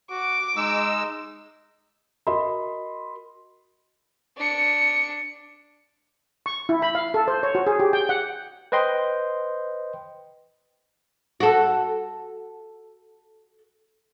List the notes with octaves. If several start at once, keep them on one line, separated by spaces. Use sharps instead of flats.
F#4 D6
G#3 D#4 E6
F#4 A#4 D#5 B5 C6
D4 C#7
C#6
E4
B5
F5
A4
C5
C#5
F#4
G#4
G4
G5
F#5
B4 C5 D#5 G5 C6
F#4 A4